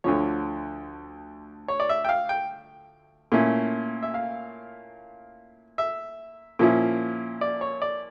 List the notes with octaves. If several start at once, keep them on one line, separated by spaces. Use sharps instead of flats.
D2 D3 F3 C#5
C#5
D5
E5
G5
F5
G5
A#2 A3 C#4 E4
E5
F5
E5
A#2 F3 C#4 E4
D5
C#5
D5